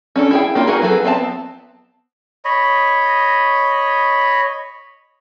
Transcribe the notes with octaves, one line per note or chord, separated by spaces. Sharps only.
C#4 D4 A4
E4 G#4 G5
A#3 D4 F4 G4
D#4 F#4 G#4 A#4 B4
F#3 G#4 A4 B4
B3 C4 D5 A5
C#5 D#5 B5